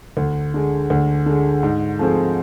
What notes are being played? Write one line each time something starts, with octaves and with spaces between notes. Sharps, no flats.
D2
D3 G#3
D2
D3 G#3
G#2
F3 A3 C4 G#4